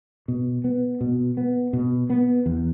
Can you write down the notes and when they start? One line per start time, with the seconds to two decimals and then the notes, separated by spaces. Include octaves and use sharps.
0.28 B2
0.64 B3
1.01 B2
1.37 B3
1.73 B2
2.10 B3
2.46 E2